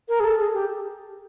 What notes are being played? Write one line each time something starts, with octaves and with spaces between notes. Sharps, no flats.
A#4
G#4
A4
G#4
G4